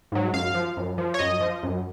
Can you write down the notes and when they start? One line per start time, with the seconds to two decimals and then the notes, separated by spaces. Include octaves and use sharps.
0.12 G#2 F#3
0.33 F#2 F5
0.54 F3
0.77 F#2
0.98 F3
1.14 C#5
1.19 F#2 D#5
1.41 F3
1.63 F#2